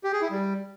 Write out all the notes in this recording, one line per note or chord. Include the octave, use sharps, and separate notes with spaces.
G4
G#4
E4
G3